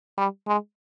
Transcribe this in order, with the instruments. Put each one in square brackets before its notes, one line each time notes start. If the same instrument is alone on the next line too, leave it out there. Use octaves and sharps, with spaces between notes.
[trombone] G3
G#3